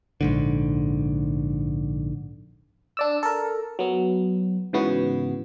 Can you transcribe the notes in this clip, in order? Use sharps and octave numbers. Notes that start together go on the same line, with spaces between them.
A#1 G#2 D3
D4 D5 E6
A4 A#4
F#3 B3
G#2 C#3 E3 B3 F#4